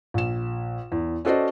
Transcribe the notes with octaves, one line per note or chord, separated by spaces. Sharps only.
A#1 E7
E2
C#4 F#4 A4 C5 D5 D#5